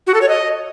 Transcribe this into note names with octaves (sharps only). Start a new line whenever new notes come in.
F#4
A4
C#5
D#5